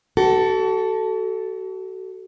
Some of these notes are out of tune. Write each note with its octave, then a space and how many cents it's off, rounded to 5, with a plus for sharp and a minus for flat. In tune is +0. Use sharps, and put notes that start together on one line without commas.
F#4 +35 A4 +0